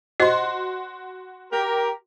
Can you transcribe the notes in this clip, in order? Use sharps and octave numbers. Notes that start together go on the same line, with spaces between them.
F#4 C5 D#5 C6
G4 A#4